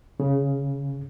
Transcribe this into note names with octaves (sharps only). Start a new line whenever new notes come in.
C#3